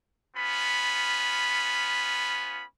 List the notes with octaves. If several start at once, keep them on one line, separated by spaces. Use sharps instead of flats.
B3 C#4 F4 B5